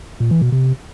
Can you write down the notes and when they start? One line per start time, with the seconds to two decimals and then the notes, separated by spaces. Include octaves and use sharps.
0.20 A#2
0.31 E3
0.42 B2
0.52 C3